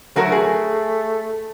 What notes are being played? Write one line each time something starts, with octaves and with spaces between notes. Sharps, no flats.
F#3 A3 F#4 A#4
G#4